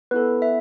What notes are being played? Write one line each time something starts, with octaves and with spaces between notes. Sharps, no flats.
B3 E4 A4 B4
E5